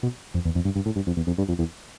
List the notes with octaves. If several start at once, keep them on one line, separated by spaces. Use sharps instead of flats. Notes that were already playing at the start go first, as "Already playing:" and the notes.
B2
F2
E2
F2
G2
G2
A2
G2
F2
E2
F2
G2
F2
E2